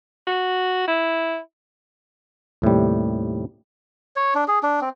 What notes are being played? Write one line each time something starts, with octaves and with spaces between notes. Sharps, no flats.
F#4
E4
D#2 A2 C3 G3
C#5
D4
G#4
D4
C4